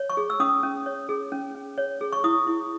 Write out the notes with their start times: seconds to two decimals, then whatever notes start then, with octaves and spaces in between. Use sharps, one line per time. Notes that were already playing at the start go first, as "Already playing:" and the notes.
Already playing: C#5
0.10 C#6
0.17 G#4
0.30 E6
0.40 C#4 D#6
0.63 C#4
0.86 C#5
1.09 G#4
1.32 C#4
1.55 C#4
1.78 C#5
2.01 G#4
2.13 C#6
2.24 E4 D#6
2.47 E4